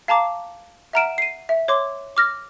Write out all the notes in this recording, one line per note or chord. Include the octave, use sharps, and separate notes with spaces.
F5 A5 A#5 D6
E5 F#5 A#5 F6 D7 E7
C7 D#7
E5
C#5 C6 D6
D6 F6 A#6